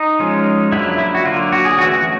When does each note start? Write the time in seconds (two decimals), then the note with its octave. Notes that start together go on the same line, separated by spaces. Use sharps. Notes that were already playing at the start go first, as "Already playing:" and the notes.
Already playing: D#4
0.20 F3 G#3 C#4
0.72 D3 F#3 A#3 E4
0.98 E4
1.15 F#4
1.25 D3 F#3 A#3 F4
1.52 F#4
1.65 G#4
1.78 E3 A3 C#4 F#4